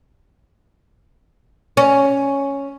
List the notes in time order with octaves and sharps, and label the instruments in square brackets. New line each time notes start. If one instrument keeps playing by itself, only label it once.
[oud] C#4